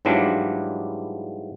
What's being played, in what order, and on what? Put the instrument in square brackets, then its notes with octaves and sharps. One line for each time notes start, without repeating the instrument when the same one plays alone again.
[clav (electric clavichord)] G#2 E3 F#3 G3 D4 F4